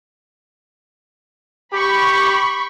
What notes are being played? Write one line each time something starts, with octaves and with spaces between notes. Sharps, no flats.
G4 B5 C#6